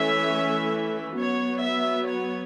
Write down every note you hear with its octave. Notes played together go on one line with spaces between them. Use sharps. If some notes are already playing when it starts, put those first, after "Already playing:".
Already playing: E3 A3 C#4 E5
F#3 B3 C#5
E5
C#5